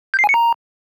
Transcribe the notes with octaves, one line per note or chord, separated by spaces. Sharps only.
G6
C7
G#5
C#7
A#5